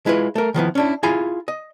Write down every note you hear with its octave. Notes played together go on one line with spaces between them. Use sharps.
G#3 E4 F4 B4
A3 A#4
D#3 F3 B3 E4
C#4 D4 E4
E4 F4 G#4 F5 G#5 A#5
D#5